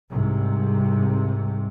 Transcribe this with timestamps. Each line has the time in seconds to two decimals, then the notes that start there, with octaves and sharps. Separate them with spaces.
0.11 C2 G#2 C3